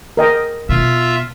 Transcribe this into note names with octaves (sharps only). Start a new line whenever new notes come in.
A#4 D#5 G5
B2 F4 E5